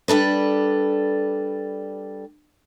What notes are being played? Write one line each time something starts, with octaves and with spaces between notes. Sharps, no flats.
G3 D4 A4 B4